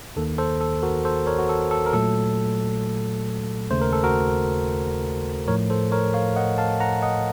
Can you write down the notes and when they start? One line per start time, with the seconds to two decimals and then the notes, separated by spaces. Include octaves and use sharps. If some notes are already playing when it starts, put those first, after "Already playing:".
0.16 D#2 D#3 A#3 A4
0.38 A4 C5
0.61 A4
0.83 F#4 A#4
1.05 A4 C5
1.27 A#4 C#5
1.38 F#4
1.49 A4
1.71 A4
1.86 A#4
1.93 A#2 F#3 A3 A4
3.70 D#2 C#3 A3 C5
3.82 A#4
3.93 A4
4.04 F#4 A#4
5.48 A2 F3 A3 A#4 C#5
5.70 A4 C5
5.92 A#4 C#5
6.14 C#5 F5
6.36 D#5 F#5
6.58 F5 A5
6.80 F#5 A#5
7.02 D#5 F#5